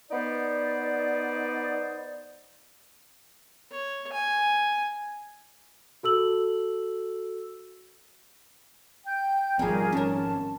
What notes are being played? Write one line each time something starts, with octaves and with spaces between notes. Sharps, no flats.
B3 D#4 C5 D5
C#5
G#5
F#4 A4 E6 F#7
G5 G6
G#1 C#3 F3 G3 C4 F4 G#4 A#4
C#4 A#4 A5